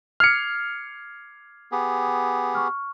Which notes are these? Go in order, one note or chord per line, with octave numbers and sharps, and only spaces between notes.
D6 F6 G#6 C7 C#7
B3 G4 G#4
C#6 F6